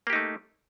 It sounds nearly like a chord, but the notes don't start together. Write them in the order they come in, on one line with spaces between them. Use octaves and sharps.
A#3 G4 D#4 A3